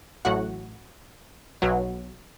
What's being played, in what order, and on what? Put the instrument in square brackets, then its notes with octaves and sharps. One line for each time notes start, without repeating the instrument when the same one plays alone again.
[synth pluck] A1 A2 F#3 F#4 F#5
B1 B2 F#3